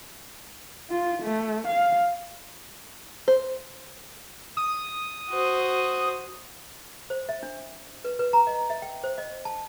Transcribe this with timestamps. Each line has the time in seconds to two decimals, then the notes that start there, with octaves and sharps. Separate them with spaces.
0.90 F4
1.23 A3
1.68 F5
3.28 C5
4.57 D#6
5.29 F#4 C5
7.10 C5
7.29 E5
7.43 D4
8.05 B4
8.19 B4
8.33 A#5
8.47 D#5
8.70 E5
8.82 G5
9.04 C5
9.18 D#5
9.45 A5